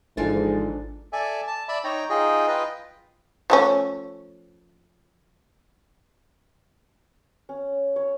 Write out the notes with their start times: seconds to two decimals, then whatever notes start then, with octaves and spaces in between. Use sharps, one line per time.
0.17 G#1 G#2 D3 E3 F3 D4 A4 A6
1.13 A4 D5 E5 G#5
1.47 A5
1.69 D5 E5 B5
1.84 D#4 C#5 G5 A#5
2.10 D#4 F4 G#4 D#5 G5
2.48 F4 B4 D#5 G5
3.50 F3 A3 C#4
7.49 C#4
7.96 C#5